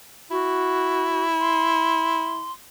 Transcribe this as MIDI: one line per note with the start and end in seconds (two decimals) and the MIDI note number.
0.31 2.50 64
0.31 1.25 66
1.40 2.52 84